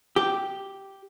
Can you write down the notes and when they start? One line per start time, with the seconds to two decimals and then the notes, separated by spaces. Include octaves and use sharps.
0.16 G4